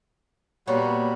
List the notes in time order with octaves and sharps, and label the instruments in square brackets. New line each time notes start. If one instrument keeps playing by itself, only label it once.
[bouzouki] A#2 B3 C#5 [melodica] G3 F#4